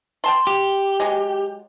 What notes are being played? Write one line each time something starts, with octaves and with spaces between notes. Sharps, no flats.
G5 A5 C6
G4
F#3 G#3